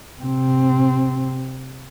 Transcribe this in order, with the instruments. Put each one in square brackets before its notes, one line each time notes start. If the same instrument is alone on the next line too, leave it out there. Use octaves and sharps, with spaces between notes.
[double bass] C3 C4